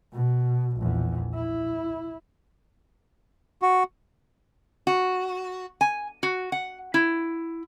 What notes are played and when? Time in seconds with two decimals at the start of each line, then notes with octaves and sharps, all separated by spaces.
0.13 B2
0.77 A#1 E2
1.35 E4
3.62 F#4
4.87 F#4
5.81 G#5
6.23 F#4
6.52 F#5
6.94 E4